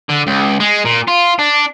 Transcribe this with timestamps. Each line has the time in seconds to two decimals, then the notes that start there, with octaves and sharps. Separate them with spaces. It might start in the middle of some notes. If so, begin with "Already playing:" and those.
0.09 D3
0.27 C#2
0.60 G#3
0.85 A#2
1.08 F4
1.39 D4